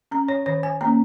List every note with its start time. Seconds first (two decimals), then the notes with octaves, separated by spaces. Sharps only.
0.11 C#4 A#5
0.28 C#5
0.46 D#3 C#5
0.63 G#5
0.81 A#3 C#4 A#5